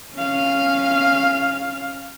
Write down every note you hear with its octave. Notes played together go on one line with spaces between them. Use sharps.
C#4 F5